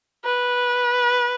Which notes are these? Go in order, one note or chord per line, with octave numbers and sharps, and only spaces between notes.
B4